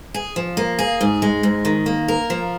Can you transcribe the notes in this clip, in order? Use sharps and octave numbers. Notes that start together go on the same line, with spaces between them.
G#4
F3
A#3
G#4
G#2
G#3
G#2
D#3
A#3
A#4
F3